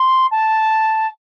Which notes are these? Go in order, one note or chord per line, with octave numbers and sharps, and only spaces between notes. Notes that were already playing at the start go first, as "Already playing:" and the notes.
Already playing: C6
A5